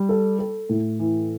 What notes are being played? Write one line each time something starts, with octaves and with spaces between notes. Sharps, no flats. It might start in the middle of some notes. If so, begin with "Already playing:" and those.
Already playing: G3
A4
A4
A2
E3